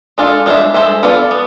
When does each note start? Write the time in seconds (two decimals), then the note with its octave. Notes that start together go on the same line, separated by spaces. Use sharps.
0.18 G#3 D4 F4 A4
0.46 G#3 D4 A4 C5 E5
0.74 G#3 D4 A4 C5 E5
1.03 B3 F4 A4 D5
1.31 B3